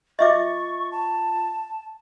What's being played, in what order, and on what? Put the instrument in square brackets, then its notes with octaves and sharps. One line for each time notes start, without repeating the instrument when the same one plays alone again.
[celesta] F4 A6 [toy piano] D#5 E5 D6 [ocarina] C#6
[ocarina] A5